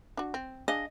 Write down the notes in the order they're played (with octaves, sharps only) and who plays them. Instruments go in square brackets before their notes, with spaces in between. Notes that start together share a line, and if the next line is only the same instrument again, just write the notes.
[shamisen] D4 F#4
C4
[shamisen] D4 G#4 F5 [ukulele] D#5